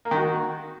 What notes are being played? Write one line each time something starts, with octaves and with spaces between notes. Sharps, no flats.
A#3
D#3
F#4